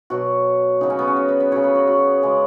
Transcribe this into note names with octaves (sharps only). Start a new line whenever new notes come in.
B2 F#3 F#4
C#3 F#3 D#4
C#4
B3
C#4
F#4
B4
B4
C#3 F#3 C#5
B4
F#4
F#4
C#3 G#3